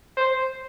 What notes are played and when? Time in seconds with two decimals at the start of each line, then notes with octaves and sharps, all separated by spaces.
0.17 C5